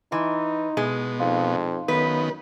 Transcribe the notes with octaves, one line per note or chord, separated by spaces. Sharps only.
E3 D#4 C6
B2 G#3
F2 D#4 F5 C6
F#2 D#3 B3 B4